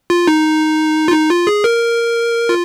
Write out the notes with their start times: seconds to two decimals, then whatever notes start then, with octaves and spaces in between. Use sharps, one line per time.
0.10 F4
0.27 D#4
1.08 F4
1.12 D#4
1.30 F4
1.47 G#4
1.64 A#4
2.49 F4